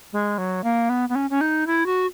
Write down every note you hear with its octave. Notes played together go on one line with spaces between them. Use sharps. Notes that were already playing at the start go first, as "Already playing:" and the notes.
G#3
F#3
A#3
B3
B3
C#4
C#4
D#4
E4
F#4